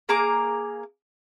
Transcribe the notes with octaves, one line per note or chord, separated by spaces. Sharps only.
A#3 G#4 A#5 D6